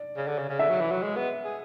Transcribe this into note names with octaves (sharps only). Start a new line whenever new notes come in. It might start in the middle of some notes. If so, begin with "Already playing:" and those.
Already playing: D5
C#3
D3
C#3
C#3
D3 E5
F#3
E3
F#3
G#3
B3
G#4